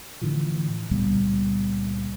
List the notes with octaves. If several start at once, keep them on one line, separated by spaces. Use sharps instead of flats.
A2 D3 E3 F3
C#2 A#2 G3 B3